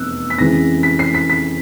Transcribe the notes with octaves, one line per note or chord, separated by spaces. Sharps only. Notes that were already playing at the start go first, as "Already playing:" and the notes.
Already playing: F1 E2 C3 E6 F#6
B6
F2 C#3 E3 G#3 A#6
B6
C7
B6
B6